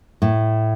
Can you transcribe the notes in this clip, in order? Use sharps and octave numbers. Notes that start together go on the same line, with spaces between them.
A2